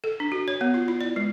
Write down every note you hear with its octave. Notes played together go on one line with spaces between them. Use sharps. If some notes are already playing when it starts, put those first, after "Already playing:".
A4
D4
F#4
C#5
B3
F4
E4
D5
G#3